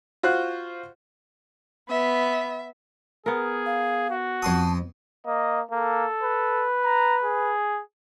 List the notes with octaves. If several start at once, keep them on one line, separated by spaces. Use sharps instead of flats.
F4 F#4 C5 F#6
B3 E5
B3 G#4 A#4
F5
F#4
F2 A5 C6 D#6
A#3 D#5
A#3 A4
B4
A#5
G#4